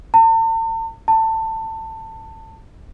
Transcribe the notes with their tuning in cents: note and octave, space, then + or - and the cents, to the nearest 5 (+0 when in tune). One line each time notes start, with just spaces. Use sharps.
A5 +45
A5 +20